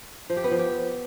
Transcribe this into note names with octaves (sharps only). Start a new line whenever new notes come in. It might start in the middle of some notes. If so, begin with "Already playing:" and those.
F3
G4
B3
F3
G4